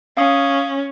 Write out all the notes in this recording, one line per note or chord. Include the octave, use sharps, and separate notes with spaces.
C#4 F5 D#6